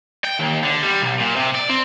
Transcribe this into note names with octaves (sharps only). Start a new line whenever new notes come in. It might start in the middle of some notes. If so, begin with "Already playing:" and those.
G5
D#2
D3
G3
B1
A#2
C3
D5
C4